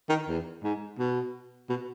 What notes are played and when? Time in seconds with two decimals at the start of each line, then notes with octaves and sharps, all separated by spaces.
0.09 D#3
0.28 E2
0.63 G#2
0.99 B2
1.70 B2